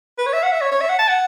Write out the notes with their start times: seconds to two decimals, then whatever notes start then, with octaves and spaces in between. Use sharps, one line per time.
0.18 B4
0.26 C#5
0.33 E5
0.43 F#5
0.52 E5
0.61 C#5
0.71 C#5
0.81 E5
0.89 F#5
0.99 A5
1.08 F#5